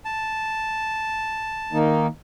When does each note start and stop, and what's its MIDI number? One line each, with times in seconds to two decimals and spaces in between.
0.05 1.78 81
1.73 2.07 51
1.73 2.07 58
1.73 2.07 63